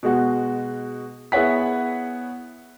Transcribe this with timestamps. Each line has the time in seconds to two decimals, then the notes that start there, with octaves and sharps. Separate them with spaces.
0.03 B2 G#3 F#4
1.32 B3 E4 G#4 C#5 F#5 B6